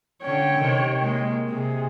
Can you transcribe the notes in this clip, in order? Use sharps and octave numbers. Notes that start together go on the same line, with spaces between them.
D3 C#4 C#5 G5
C3 D#3
G#3 A#3
C3 G#4